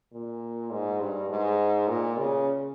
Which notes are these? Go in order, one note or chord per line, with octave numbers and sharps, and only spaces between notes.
A#2
G#2
G2
G#2
A#2
C#3